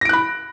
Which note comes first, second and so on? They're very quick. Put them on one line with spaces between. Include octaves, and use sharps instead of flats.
A#6 D7 F#6 B5